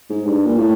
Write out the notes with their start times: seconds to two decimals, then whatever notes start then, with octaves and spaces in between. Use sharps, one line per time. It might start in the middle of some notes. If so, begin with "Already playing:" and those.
0.10 G#2
0.25 G2
0.46 A#2
0.58 A2